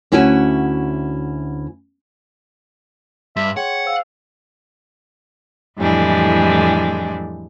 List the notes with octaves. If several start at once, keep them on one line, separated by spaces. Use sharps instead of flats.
D2 C#4 E4 F#4 G#5
G2 E5 C6
G#4 C#5 F#5 G5
C5 F5 E6
F2 A2 E3 G3 G#3 D4